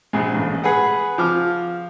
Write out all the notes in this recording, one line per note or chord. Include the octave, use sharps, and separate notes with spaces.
A#1 G#3
A1
G#4 B4 F#5
F3 D6 F6